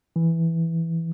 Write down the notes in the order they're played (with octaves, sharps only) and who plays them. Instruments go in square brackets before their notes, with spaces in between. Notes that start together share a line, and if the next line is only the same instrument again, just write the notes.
[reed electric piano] E3